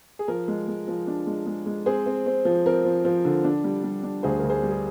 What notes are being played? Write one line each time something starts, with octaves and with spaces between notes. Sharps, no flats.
G#4
F3 A#4
G#3
G#3
F3
D4
G#3
G#3
G#3
C4 G#4 C5
C4
C4
F3
C4 A#4
F3
F3
D3
D4
G3
G3
D4
D2 G#4 C5
D2 A#4
G#4 C5
G3
G#4